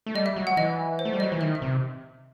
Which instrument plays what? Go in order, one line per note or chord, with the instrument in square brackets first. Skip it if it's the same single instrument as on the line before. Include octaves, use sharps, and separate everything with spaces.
[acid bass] A3
[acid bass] G3 [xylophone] D#5
[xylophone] E5
[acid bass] F#3
[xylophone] F#5
[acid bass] E3 [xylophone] D#5
[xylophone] C5
[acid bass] A3
G3
[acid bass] F#3 [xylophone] D#5
[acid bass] E3
[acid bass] D#3 [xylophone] E5
[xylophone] E5
[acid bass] C3